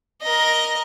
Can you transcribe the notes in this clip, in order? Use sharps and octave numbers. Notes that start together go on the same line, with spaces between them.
A#4 D#5